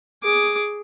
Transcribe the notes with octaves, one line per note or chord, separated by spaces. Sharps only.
G#4 D6